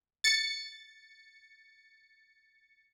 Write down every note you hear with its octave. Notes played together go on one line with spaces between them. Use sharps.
A6 C#7